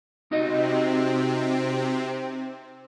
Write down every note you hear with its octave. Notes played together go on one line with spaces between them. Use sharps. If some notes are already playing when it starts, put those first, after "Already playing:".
C3 C4 D#4 F#4 D#5